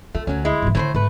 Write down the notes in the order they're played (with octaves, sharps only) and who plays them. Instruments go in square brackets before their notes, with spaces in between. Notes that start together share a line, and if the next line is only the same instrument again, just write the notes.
[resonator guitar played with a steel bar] A3 [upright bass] F4
[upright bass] D2 [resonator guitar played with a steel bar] F#3 C#4
[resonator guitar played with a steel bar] G#3 E4
[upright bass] G#2 E3
[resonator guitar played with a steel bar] A2 B4 C5 [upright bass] D3 D#3
[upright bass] G#2 [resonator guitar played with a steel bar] A3 B4